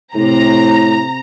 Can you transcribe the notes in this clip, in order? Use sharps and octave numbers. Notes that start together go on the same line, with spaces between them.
A2 C3 A#5